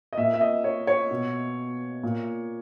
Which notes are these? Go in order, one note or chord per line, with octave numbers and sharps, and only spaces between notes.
D#5
A#2 E5
E5
D#5
C#5
C#5
B2
A#2